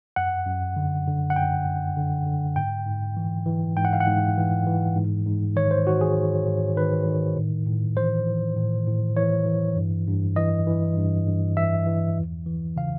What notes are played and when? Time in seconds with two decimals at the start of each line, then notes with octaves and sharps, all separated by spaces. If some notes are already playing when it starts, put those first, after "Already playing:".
0.16 F#2 F#5
0.46 F#2
0.76 D3
1.07 D3
1.30 F#5
1.36 F#2 G5
1.66 F#2
1.96 D3
2.26 D3
2.56 G#2 G5
2.86 G#2
3.17 E3
3.46 E3
3.76 G#2 G5
3.85 F#5
3.93 F5
4.00 F#5
4.07 G#2
4.37 E3
4.66 E3
4.96 G#2
5.26 G#2
5.56 D#3 C#5
5.71 C5
5.86 D#3 F#4
6.01 G#4
6.16 G#2
6.47 G#2
6.76 D#3 B4
7.06 D#3
7.36 A2
7.66 A2
7.97 E3 C5
8.27 E3
8.56 A2
8.87 A2
9.17 E3 C#5
9.46 E3
9.76 G2
10.07 G2
10.36 E3 D#5
10.67 E3
10.97 G2
11.27 G2
11.57 E3 E5
11.87 E3
12.18 E2
12.46 E3
12.76 C#3 F5